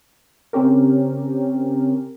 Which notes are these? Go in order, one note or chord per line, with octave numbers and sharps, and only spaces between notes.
C#3 C4 C#4 G4 A#4